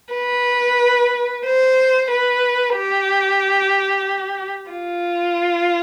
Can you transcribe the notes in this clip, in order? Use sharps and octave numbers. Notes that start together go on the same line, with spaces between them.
B4
C5
B4
G4
F4